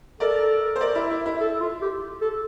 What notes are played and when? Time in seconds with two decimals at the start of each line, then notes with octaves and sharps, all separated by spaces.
0.20 A4 A#4 D5
0.76 C5
0.81 A#4 D5
0.95 E4
1.11 E4
1.26 E4
1.40 A4
1.61 F4
1.81 G4
2.21 A4